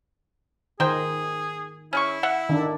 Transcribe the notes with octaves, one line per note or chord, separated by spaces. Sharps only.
D#3 G#4 A#4 C5 G5
C#4 E4 G#4 C#6
E5 F#5
D#3 D4